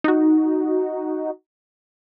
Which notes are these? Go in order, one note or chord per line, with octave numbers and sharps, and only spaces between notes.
D#4 F#4